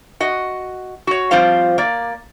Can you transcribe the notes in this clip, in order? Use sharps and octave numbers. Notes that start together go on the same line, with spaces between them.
F#4 D#5
F#4 C#5
F3 G3 C4 F4 C5 F5
A#3 D5